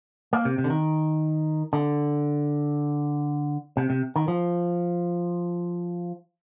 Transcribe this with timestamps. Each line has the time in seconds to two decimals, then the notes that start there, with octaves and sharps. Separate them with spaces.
0.33 A#3
0.45 C3
0.58 C3
0.64 D3
0.70 D#3
1.73 D3
3.77 C3
3.90 C3
4.16 D#3
4.28 F3